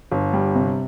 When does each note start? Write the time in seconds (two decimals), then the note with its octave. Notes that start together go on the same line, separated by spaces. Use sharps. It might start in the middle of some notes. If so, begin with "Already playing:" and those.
0.12 G1
0.33 G3
0.55 C3